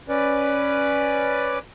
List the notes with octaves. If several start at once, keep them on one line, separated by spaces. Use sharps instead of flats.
C#4 B4 D5